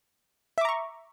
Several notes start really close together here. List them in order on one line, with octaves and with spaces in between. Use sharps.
E5 D6 A#5 C#6